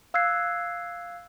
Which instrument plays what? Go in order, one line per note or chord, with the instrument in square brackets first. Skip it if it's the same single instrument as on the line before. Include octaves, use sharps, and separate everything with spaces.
[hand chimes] F5 E6 F#6 G#6 C7